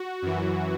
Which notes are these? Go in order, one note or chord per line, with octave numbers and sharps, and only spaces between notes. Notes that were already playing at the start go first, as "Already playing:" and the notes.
Already playing: F#4
F#2 E3